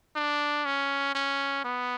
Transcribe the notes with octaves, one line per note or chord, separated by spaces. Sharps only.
D4
C#4
C#4
B3